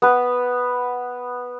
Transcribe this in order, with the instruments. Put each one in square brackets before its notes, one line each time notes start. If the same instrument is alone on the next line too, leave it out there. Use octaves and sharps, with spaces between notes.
[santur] B3 B4